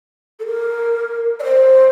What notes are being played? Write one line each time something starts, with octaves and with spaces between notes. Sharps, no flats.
A4
A#4
D5
C5